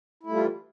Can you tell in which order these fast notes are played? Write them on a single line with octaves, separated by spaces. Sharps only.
E4 A3 G3 F4 E3